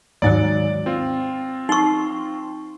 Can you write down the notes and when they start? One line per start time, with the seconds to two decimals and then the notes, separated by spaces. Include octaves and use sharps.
0.22 D#2 G#2 F#3 D5 A6
0.86 C4 F4
1.69 D#4 C6 C#6